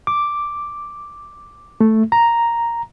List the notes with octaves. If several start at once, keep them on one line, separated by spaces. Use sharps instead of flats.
D6
A3
A#5